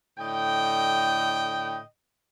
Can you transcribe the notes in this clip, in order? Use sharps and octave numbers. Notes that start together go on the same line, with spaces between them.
A2 D3 D#5 G5